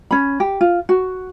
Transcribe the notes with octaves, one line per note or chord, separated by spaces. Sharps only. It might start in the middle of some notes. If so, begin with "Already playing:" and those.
C#4 B5
G4
F4
F#4